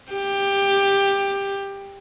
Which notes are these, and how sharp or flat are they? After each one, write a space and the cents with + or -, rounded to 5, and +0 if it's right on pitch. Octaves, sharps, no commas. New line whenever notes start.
G4 +15